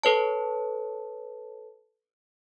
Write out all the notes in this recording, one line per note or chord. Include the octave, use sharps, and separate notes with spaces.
A4 B4 C#5 A5